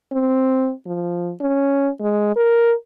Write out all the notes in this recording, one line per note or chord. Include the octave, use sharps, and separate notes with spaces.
C4
F3
C#4
G#3
A#4